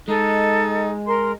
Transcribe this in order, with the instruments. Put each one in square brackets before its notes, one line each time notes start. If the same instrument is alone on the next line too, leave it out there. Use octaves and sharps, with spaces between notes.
[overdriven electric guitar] G#3 [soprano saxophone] D#4 [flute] A4
[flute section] A#4 C6